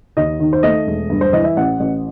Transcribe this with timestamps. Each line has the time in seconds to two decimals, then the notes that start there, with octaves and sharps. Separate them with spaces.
0.17 D#2 D#5
0.40 D#3
0.53 C5
0.63 A3 D#5
0.87 E1
1.10 G2
1.21 C5
1.33 E3 D#5
1.44 E5
1.57 A1 F#5
1.80 A1